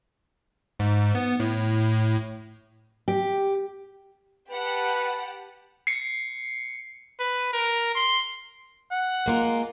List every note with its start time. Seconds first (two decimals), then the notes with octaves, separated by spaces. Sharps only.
0.79 G#2
1.15 B3
1.40 A2
3.08 G4
4.51 G4 B4 F#5 A5
5.87 C7 C#7
7.19 B4
7.53 A#4
7.95 C6
8.92 F#5
9.26 G#3 A#3 F4